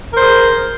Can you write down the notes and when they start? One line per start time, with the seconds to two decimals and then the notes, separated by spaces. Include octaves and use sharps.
0.14 A#4
0.17 C5
0.21 G#4